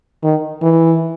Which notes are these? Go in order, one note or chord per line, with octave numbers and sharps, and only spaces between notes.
D#3
E3